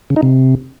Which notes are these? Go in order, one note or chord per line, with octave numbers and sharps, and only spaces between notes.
C#3
D#4
C3